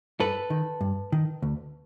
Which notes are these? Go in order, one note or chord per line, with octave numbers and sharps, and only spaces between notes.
G2 A4 B4
D#3
G2
D#3
D2